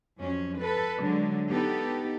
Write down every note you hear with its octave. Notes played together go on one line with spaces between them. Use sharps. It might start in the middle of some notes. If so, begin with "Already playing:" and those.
F2 F#3 C#4
A4 B4
D3 F#3 G#3
B3 D#4 G4 A4